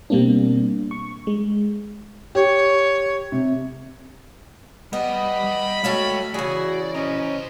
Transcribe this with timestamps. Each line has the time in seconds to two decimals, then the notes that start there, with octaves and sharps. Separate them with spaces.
0.10 B2 G3 A#3 C4 D4
0.91 C#6
1.27 G#3
2.35 G4 C#5
3.32 C3
4.93 G3 B3 D#5 B5
5.44 G3
5.84 G#3 A3 F#4 C#5 F5 G5
6.34 C#3 E3 F#4 G#4 D5
6.95 C#4 C5 D#5 A#5